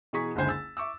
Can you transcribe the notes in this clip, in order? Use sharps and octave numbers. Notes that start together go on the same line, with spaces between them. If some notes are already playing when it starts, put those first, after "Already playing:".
B2 E3 G#4 A#5 C#6 B6
F#1 C#2 D3 C5 G#5
E6 A6
E5 C#6 D6 E6